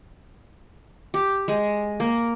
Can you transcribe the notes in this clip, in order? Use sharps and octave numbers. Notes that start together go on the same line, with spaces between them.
G4
G#3
A#3